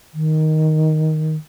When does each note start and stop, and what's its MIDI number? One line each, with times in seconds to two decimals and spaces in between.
0.14 1.36 51